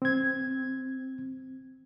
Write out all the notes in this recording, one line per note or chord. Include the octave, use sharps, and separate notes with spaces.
C4 G#6